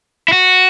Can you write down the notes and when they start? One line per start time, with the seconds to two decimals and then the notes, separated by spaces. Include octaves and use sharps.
0.28 E4
0.33 F#4